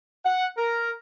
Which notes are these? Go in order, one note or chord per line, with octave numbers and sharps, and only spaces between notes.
F#5
A#4